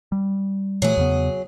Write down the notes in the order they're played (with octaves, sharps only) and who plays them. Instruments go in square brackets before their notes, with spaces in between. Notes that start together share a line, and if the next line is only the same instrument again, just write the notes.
[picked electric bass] G3
[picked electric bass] A#2 E3 A3 [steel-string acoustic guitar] F#3 G#4
[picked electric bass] E2 C#3 B3